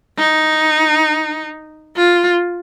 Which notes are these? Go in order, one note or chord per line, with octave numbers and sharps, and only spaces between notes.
D#4
F4